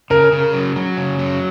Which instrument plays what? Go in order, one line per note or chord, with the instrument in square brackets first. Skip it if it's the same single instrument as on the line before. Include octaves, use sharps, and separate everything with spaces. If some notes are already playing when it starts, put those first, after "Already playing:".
[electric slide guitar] C#3 [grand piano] A#4
[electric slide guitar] C#3
F#3
F#3
C#3
F#3